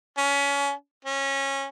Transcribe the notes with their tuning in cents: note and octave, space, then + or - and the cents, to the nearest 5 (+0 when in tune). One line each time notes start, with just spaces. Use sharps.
C#4 +25
C#4 -20